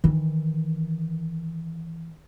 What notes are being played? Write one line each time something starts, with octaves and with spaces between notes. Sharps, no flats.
D#3 E3